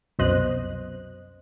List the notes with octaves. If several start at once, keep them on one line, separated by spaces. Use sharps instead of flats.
C2 F#2 B2 C5 D#5 F#6